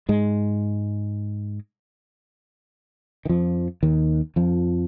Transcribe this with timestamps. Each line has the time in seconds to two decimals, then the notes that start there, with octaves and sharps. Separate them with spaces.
0.09 G#2 G#3
3.25 D#3
3.29 F2 F3
3.83 D#2 D#3
4.36 F2 F3